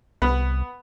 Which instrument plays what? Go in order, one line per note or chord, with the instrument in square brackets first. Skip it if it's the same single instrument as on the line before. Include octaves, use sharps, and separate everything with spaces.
[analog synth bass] C2 [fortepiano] B3 B5 F#6